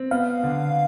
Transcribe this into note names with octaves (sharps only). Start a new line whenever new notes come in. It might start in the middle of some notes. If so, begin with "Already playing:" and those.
Already playing: C4
B3 F5
D3